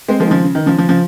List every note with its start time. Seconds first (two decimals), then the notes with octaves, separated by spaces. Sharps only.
0.08 G#3 C4
0.20 F3 G#3
0.27 D#3
0.31 C#3 F3
0.44 C#3
0.55 D#3
0.66 C#3 F3
0.77 C#3 F3
0.89 C#3 F3